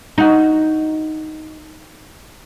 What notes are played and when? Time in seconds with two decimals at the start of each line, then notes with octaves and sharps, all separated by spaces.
0.18 D#4 F#4